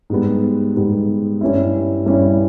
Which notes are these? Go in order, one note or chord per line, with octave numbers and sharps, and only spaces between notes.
G#2 G3 B3
G#2 G3 B3
G2 G3 C#4 E4
G2 G3 C#4 E4